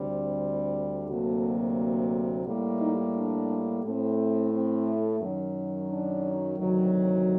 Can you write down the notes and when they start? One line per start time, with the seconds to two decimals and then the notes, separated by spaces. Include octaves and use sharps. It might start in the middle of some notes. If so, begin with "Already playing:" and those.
Already playing: D2 D3 G3 C4
1.08 D2 C3 F#3 A#3 F#4 A4
2.46 A2 G3 A#3
2.80 D#4 G4
3.15 D4
3.83 A2 A3 C4
4.51 C4
5.20 F#2 D#3 F#3
5.89 D4
6.58 D2 C3 D#3 F#3